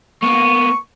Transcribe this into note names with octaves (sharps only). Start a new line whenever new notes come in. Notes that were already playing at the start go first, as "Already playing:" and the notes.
A#3 B3 C#6